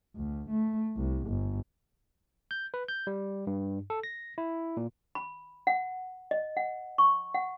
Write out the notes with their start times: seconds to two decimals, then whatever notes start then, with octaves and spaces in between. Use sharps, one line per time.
0.16 D2
0.50 A3
0.96 C2
1.28 G1
2.51 G6
2.74 B4
2.88 G6
3.07 G3
3.47 G2
3.90 A4
4.03 A#6
4.38 E4
4.77 A#2
5.15 B5
5.67 F#5
6.31 D#5
6.57 F#5
6.98 C#6
7.34 F#5